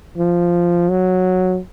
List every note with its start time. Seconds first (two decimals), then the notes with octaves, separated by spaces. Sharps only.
0.18 F3
0.90 F#3